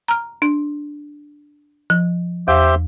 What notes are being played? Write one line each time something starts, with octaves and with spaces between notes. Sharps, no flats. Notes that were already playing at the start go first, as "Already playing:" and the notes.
A#5 F6
D4
F3
E2 G4 C5 E5